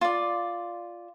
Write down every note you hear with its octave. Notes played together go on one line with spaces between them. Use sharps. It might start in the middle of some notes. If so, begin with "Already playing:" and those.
F4 D5